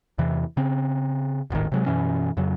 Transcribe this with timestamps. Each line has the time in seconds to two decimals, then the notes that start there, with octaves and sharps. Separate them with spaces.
0.18 E2 C3 E3
0.57 C#3 C4
1.50 D#1 G#1 A2 D#3
1.72 C3 F#3 G#3
1.86 F#2 B2 E3 C#4
2.37 F2 C#3 F#3